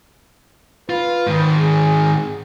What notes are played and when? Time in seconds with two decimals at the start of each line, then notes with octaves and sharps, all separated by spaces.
0.90 F4 B4
1.27 G#2 D#3
1.59 G#4